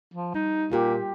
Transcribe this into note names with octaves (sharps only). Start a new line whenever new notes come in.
F3
G3 D#4
A#2 F4 G4